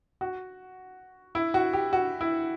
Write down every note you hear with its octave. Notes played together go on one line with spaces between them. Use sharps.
F#4
E4
F#4
G4
F#4
E4